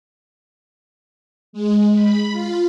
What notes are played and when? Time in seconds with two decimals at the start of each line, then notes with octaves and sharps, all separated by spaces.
1.53 G#3
1.95 B5
2.32 F4